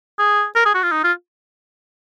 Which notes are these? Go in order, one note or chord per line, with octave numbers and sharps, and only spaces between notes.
G#4
A#4
G#4
F#4
F4
D#4
F4